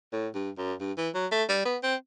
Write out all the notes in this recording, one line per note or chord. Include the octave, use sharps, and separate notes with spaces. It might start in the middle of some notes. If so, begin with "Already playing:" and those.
A2
G2
F#2
G2
E3
F#3
A3
G3
B3
C4